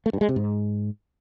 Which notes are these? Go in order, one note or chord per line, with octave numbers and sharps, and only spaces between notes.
A3
G2
G#3
C3
G#2